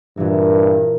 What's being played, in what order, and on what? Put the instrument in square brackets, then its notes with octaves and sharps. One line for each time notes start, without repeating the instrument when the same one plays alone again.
[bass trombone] G2 [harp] A#2 E3